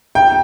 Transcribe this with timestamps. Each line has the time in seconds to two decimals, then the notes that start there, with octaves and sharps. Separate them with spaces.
0.15 G5